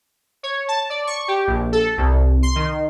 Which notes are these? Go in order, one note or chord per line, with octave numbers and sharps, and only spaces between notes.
C#5
A5
D5
C#6
G4
A#1
A4
C2
C6
D#3